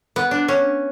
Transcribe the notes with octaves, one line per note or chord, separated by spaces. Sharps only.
B3
D4
C#4